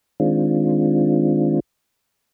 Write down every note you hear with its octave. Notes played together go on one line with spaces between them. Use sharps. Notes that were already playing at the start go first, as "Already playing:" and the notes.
D#3 G#3 C4 D4 F4